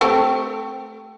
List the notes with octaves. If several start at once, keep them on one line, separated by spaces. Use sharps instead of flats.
A3 C4 G4